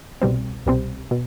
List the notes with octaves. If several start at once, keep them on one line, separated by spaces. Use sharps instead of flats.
C2 B2 G3 C4
C2 B2 G3 C4
B2